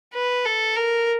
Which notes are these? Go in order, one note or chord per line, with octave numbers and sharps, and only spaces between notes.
B4
A4
A#4